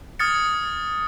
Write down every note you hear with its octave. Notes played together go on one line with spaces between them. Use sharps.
D#6 F6 G#6 A6 C#7